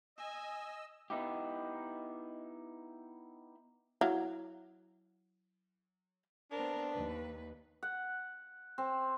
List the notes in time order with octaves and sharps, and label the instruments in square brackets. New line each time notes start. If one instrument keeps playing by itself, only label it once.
[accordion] D#5 E6 [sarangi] G#5
[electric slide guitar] B3 D#4 E4 G4
[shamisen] F#3 E4 F5
[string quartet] B3 C4 A#4 [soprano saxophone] D4
[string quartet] D#2 B4
[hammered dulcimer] F#5
C4